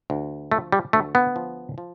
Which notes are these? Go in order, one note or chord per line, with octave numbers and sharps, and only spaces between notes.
D2
F3 A3
G3
D2 A3
B3
F3
F3